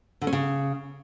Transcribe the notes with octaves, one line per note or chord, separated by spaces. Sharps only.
D3
C#4
C#3